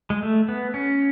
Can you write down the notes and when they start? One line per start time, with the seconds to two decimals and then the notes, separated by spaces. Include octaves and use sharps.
0.10 G#3
0.22 A3
0.48 B3
0.74 C#4